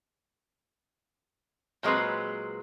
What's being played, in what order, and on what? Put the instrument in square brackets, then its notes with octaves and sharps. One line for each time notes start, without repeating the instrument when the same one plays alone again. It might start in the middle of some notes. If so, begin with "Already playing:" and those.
[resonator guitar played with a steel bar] A#2 F#3 G#3 C4 B4